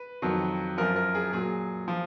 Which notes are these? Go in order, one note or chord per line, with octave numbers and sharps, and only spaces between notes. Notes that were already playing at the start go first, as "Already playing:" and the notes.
Already playing: B4
F2 D#3 F#3
F#2 F3 A#4
A#4
G#4
A#2 F#3 G#4
F3